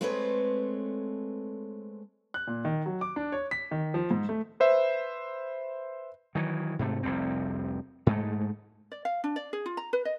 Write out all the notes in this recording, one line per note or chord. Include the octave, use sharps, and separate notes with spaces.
G#3 A3 C4 A4 B4 C#5
F#6
A#2
D#3
F#3
D6
D4
C#5
B6
D#3
F3
G#2
A3
B4 C5 E5
D#3 E3 F#3
G#2 C3 A3
F1 C2 F2 C4
G#2 G#3 A3
D5
F5
D4
D5
G#4
F4
A#5
B4
D#5